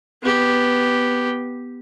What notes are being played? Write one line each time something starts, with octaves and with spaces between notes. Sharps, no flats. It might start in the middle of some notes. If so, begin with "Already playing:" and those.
B3 G4